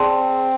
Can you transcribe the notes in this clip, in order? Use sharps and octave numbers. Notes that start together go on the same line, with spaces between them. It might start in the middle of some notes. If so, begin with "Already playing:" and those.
Already playing: C4 G#4 D5 A5 C6